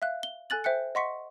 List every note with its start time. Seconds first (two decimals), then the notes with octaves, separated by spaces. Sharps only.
0.02 E5 F5 F#6
0.23 G7
0.50 A4 G#5 F#6 A6 F#7
0.64 C5 E5 G5 F#6 C#7
0.95 D#5 F#5 C6 C#6 B6 C#7